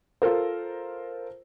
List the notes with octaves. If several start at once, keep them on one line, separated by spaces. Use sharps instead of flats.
F4 A4 A#4 C5